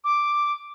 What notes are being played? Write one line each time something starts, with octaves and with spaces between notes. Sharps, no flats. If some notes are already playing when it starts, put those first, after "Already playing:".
D6